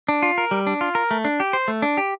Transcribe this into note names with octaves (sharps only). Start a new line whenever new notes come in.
D4
F4
A#4
G3
D4
F4
A#4
A3
D4
G4
C5
A3
D4
G4